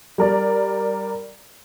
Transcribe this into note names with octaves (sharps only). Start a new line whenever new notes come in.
G3 A#4 D5